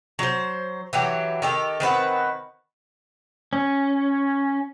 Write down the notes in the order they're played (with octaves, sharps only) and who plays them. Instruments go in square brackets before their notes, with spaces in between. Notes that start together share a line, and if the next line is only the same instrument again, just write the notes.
[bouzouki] F#3 C5
E3 F#3 G4
D#3 G4 A4
D#3 C4 B4 F#5
[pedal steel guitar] C#4